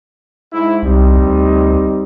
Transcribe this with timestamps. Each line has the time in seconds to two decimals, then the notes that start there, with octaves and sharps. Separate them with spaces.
0.53 G#2 E4
0.83 C2 G3 C4 D#4
1.16 D2